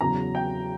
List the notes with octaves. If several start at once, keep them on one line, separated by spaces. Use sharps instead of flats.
E2 C#3 F#3 A#5
G5